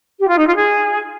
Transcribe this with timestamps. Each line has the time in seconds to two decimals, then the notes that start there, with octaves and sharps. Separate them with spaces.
0.20 G4
0.29 F4
0.38 D#4
0.47 F4
0.56 G#4